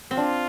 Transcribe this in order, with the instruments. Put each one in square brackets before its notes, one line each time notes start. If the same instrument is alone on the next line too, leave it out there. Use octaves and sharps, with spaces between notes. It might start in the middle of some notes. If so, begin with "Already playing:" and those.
[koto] C4
[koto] D4 [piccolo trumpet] F4